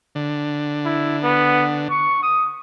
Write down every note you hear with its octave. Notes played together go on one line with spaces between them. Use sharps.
D3
E4
B3
C#6
D#6